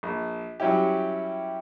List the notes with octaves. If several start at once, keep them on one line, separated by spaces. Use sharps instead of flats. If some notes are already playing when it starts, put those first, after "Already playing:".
A#1
F#3 G3 C#4 E4 G4